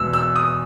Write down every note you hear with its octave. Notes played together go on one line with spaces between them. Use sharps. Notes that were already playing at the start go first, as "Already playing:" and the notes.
Already playing: E2 B2 G#3 E6
E6
D#6